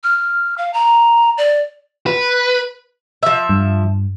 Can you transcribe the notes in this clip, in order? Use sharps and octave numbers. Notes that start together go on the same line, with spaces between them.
F6
F5
A#5
D5
B4
F3 E5
G2